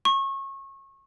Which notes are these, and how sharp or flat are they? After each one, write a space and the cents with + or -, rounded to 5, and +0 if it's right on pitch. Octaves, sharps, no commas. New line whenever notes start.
C#6 -30